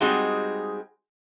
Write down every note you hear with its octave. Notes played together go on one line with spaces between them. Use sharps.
G3 G#3 C4 D#4 F#4 G#4